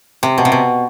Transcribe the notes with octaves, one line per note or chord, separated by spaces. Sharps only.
C3
B2
C3
B2